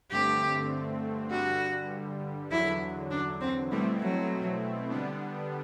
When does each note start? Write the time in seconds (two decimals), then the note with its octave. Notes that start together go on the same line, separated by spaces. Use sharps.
0.11 G2 D3 A3 C4 G4
1.31 G2 D3 G3 F#4
2.51 E2 D3 F#3 E4
3.11 D4
3.41 C4
3.71 B2 G3 A3 C4 E4
4.00 F#3
4.90 D3 G3 B3 D4